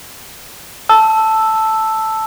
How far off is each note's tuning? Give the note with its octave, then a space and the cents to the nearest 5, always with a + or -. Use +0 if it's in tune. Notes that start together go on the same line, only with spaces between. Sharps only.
A5 +0 E6 +0